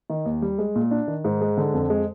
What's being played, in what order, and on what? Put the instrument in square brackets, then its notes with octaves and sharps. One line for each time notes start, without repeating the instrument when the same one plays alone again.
[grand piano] D#3
D#2
G3
G#3
A#2
D4
D#3
G#2
G#3
D3
F2
G#3